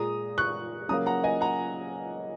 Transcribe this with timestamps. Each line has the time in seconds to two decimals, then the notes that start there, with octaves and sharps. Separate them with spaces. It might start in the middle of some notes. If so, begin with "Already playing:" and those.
Already playing: A#2 G#3 A#5 D#6
0.38 C#6 F#6
0.89 C#3 F#3 A#3 A#5 D#6
1.06 F#5 A#5
1.24 D#5 G#5
1.41 F#5 A#5